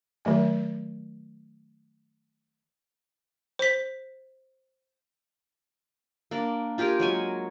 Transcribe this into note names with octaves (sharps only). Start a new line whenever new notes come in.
D#3 F#3 A3 G#5
C5 B6
A#3 D4
F4 G4 G#4 A#4
F#3 G#3 G#5